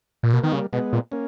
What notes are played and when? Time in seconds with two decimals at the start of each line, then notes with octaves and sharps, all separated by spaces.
0.23 A#2
0.33 B2 A#3
0.43 D#3 B3
0.52 C#3 G3 A#3
0.73 B2 G#3 B3
0.93 A#2
1.12 A#3 C#4